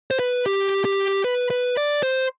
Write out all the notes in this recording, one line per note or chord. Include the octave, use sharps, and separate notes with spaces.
C5
B4
G4
G4
B4
B4
D5
C5